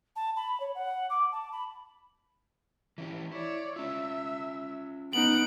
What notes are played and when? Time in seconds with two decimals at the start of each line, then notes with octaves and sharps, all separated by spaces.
0.16 A5
0.36 B5
0.60 C#5
0.75 F#5
1.09 D6
1.32 A5
1.52 B5
2.98 E3 C#4 G4
3.32 E4 C#5 D5
3.76 C#4 F4 E5
5.13 B3 D#4 F#5 D7 F#7